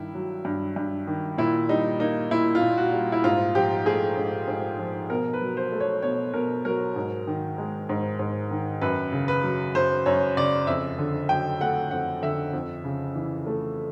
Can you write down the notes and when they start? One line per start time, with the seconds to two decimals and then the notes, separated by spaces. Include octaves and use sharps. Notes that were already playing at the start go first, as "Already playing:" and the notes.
Already playing: G2 D#3 E4
0.14 F#3
0.45 G2
0.76 G2
1.07 D#3
1.38 A#2 E4
1.69 G3 D#4
1.99 A#3 D#4
2.31 A#2 E4
2.55 F4
2.61 A#2
2.77 F#4
2.93 G3
3.12 E4
3.24 G#2 F4
3.55 F3 G4
3.86 A3 G#4
4.17 G#2
4.48 G#2
4.79 F3
5.10 B2 A#4
5.33 B4
5.41 F#3
5.57 C5
5.72 A3
5.80 C#5
6.02 B2 C#5
6.34 B2 A#4
6.65 F#3 A#4
6.96 G#2
7.27 D#3
7.58 G#3
7.89 G#2
8.19 G#2
8.51 D#3
8.81 F#2 B4
9.12 C#3
9.28 B4
9.43 F#3
9.75 F#2 C5
10.06 F#2 C#5
10.37 C#3 D5
10.67 F2 E5
10.99 D3
11.29 F#3 G5
11.61 A3 F#5
11.91 F2 F#5
12.22 D3 E5
12.53 F2
12.84 C#3
13.15 E3
13.46 A3